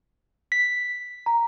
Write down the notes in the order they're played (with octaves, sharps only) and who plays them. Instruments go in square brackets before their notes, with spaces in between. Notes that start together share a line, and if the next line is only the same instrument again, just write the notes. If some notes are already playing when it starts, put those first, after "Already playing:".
[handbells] B6
[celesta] A#5